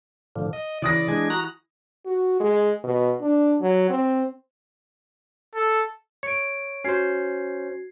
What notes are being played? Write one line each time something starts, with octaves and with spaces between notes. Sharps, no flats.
A2 D3 F3
D#5
C#3 E3 D5 D#6 A#6
G#3 D4 G#4
F#4 A#5 F#6
F#4
G#3
B2
D4
F#3
C4
A4
C#5 C#7 D7
C#4 F#4 C5 G#6 C7